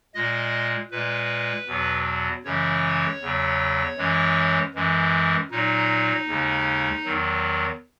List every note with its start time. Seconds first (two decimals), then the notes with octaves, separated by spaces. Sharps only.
0.14 A#2 G#3 D#5
0.91 A#2 G#3 B4
1.67 E2 B2 F#3
2.44 F#2 C#3 E3 G#3 C#5
3.21 E2 C#3 F#3
3.98 F#2 E3 G#3
4.74 F#2 E3 G#3
5.51 A#2 F#3 D#4
6.27 D#2 C#3 G#3
7.04 E2 D#3 F#3